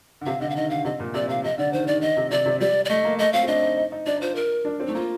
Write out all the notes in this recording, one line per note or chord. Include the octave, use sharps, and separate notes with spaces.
D3
C3 F5
D3 D#5
F5
D#3 D#5
D3 F5
C3 D#5
A#2
C3 D5
C3 F5
C3 D#5
D3 D5
D#3 C5
D#3 D5
D#3 D#5
C3
C3 D5
C3
G3 D5
D5
A3 D#5
A#3
A3 D#5
C4 F5
C4
D4 D#5
D#4
D#4
D#4
D4 D5
D#4
F4 C5
A#4
D4
C4
A3 D#4
A#3 F4